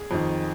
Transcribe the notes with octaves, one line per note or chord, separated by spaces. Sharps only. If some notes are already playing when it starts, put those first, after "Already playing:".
Already playing: G#4
F2 D#3